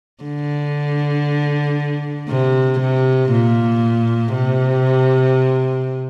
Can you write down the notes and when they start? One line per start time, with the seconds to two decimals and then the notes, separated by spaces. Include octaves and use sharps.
0.24 D3
2.28 C3
2.79 C3
3.30 A#2
4.33 C3